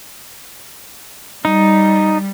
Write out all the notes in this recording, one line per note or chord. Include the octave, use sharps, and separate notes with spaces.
G3 D#4